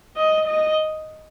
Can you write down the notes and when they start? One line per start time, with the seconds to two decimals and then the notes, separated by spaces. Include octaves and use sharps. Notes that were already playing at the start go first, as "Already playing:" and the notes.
0.16 D#5
0.48 D#5